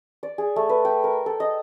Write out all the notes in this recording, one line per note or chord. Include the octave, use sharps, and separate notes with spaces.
D5
G#4
A3
B4
G5
A#4
A4
D#5